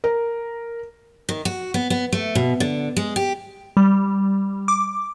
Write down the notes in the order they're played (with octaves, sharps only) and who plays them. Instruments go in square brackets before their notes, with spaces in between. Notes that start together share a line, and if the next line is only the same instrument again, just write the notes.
[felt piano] A#4
[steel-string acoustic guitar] D#3
F#4
B3
B3
A3
B2
D3
G#3
G4
[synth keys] G3
D6